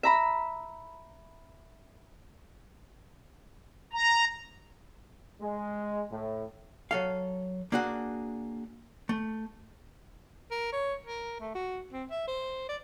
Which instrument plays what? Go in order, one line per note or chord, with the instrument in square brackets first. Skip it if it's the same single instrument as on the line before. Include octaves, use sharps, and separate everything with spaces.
[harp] E5 A#5 B5
[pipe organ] A#5
[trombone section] G#3
A2
[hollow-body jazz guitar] F#3 A4 F5
A#3 D4 F#4 G#4 F#5
A3
[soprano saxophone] A#4
C#5
A#4
A3
F#4
C4
E5
C5
D5